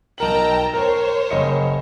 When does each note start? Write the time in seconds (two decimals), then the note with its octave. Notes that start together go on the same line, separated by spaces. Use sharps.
0.18 B1 A#4 G5 A5 A#5 F#7
0.74 A#4 C5 C#5
1.30 F#1 D#5 C#7